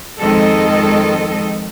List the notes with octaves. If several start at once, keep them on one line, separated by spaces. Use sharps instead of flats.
F2 D#3 G#3 C4 A4 D#5